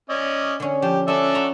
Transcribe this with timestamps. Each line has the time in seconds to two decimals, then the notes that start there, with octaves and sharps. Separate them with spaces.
0.09 C#4 D5 D#5
0.60 D3 C#4
0.82 F3 G4
1.08 C#4 A4 D5 E5
1.35 F#4 A#5